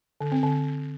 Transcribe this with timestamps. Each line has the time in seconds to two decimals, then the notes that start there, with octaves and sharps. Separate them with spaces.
0.21 D3
0.32 C4
0.43 D3